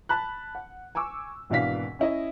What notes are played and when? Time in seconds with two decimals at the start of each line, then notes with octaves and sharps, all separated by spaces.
0.09 A5 B5 F#6
0.55 F#5
0.95 G#5 C#6 D6 E6
1.50 G#1 B2 E3 D4 F5 B6
1.99 C#4 E4 D#5